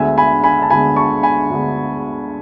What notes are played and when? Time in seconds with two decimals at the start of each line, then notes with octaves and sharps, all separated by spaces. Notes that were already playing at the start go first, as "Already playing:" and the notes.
Already playing: D2 D3 G#3 B3 E5 G#5
0.18 G#5 B5
0.44 G#5 B5
0.62 A5
0.70 D2 D3 G#3 B3 G#5 B5
0.96 A5 C#6
1.23 G#5 B5
1.50 D2 D3 G#3 B3